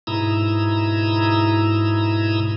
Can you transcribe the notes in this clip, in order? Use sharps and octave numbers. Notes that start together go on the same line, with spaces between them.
G#2 B2 E4 A#5 D#6 E6